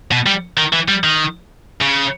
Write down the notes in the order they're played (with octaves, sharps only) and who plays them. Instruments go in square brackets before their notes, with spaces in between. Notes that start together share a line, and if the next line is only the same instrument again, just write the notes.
[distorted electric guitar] B2
G3
D#3
E3
G3
D#3
C#3